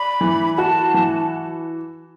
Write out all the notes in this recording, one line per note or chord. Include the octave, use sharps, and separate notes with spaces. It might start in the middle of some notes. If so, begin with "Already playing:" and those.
Already playing: D5 B5
E3
F#4 A5
E3